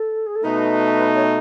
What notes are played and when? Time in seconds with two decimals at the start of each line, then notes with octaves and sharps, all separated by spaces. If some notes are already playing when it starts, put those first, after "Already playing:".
Already playing: A4
0.26 G#4
0.35 A4
0.44 B2 A3 D#4 B4
1.15 C#5